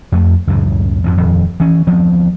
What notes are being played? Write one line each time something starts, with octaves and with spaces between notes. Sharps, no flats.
F2 A3
C#2 F#2 A2 C#3
F2 G#2 F3
D#1 F2
E3 C#4
D2 F3 B3 C4